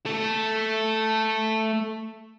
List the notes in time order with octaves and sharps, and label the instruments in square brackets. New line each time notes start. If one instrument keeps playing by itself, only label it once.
[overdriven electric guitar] A3 A4